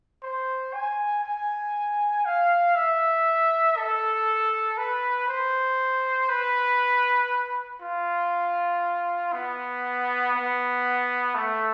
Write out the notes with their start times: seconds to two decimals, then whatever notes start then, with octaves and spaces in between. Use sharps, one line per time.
0.23 C5
0.73 G#5
1.24 G#5
2.25 F5
2.75 E5
3.77 A4
4.78 B4
5.28 C5
6.29 B4
7.81 F4
9.33 B3
10.34 B3
11.35 A3